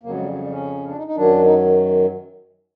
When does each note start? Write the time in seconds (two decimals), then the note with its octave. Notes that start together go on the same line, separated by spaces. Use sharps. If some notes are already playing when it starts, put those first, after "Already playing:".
0.03 F2 C#3 F#3 A#3
0.12 G#3
0.22 G3
0.31 F#3
0.41 G3
0.51 C#4
0.88 D4
0.97 D#4
1.07 D#4
1.16 F#2 D#3 F#3 D4
1.44 D#4